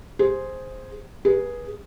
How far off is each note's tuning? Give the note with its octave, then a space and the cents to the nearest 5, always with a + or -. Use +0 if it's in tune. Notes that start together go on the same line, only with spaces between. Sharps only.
G#4 +0 C5 +0
G#4 +0 B4 -25